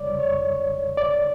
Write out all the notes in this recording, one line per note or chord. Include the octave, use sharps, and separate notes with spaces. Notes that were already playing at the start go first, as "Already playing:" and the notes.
Already playing: F2 C#3 G3 C#5 D5
C#5
D5